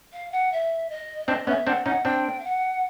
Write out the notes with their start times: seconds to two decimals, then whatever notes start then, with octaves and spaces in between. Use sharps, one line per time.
0.12 F5
0.32 F#5
0.52 E5
0.89 D#5
1.28 C4 D4 D#5
1.47 B3 C#4 E5
1.67 C4 D4 F#5
1.86 C#4 D#4 F#5
2.05 C4 D4 G5
2.39 F5
2.44 F#5